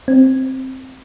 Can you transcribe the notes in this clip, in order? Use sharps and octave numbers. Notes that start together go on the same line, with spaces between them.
C4